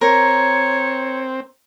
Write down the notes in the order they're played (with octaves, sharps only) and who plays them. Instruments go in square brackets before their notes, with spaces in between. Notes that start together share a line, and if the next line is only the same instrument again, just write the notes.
[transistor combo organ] C4 [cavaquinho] A#4 [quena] C#5